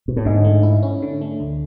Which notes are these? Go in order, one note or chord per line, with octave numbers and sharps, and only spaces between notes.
B2
A2
G#2 D3
A3
E4
C#4
D3
A3
D2